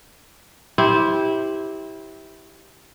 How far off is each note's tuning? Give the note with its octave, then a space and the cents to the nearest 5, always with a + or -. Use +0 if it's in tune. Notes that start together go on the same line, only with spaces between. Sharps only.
E4 -20 G4 +0 C5 +0